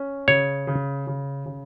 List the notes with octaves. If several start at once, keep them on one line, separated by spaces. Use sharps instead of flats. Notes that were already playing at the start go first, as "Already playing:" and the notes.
Already playing: C#4
C#3 C#5
C#3
C#3
C#3